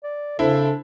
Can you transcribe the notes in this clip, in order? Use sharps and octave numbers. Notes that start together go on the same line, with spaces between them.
D5
C#3 C4 D4 E4 A4